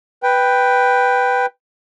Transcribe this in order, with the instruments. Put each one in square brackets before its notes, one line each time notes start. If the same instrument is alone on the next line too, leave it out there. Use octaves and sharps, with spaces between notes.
[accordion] B4 G5